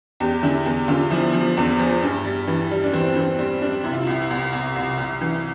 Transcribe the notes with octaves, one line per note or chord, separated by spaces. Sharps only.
E2 G4
D3 E4
E2
D3 F4
F3 E4
F3
E2
F3
G2
G3
E3
G3
D4
E3 C4
E3 C4
G3 C4
G3 D4
C3 E4
F4
C2 E4
C2
C2
C2
C2
E3